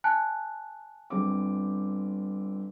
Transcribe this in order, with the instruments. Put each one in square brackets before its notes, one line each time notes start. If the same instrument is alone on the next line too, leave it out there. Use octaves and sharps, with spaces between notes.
[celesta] G#5 A5 F#6
[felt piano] G1 C4 D6